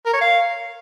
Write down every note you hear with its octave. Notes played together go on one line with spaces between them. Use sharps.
A#4
C#5
F5